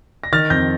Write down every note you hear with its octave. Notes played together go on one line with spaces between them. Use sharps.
A#6
D#3 F6 A6
F2 G6 A#6